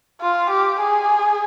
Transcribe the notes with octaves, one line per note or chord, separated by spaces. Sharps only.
F4
G4
G#4